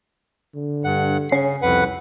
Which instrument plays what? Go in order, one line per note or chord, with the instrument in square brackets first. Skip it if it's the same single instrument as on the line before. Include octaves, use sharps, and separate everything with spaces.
[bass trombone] D3
[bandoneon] G2 F#5
[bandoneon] C#3 [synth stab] C#4 C7
[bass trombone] C2 [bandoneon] F2 B4 F#5